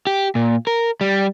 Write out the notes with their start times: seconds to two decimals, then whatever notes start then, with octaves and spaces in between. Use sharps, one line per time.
0.07 G4
0.35 A#2
0.67 A#4
1.01 G3